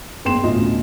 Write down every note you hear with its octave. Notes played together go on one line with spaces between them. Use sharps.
F#1 B3 C4 G5 C6 E7
A1 D2 B2 C#4 F4 D#5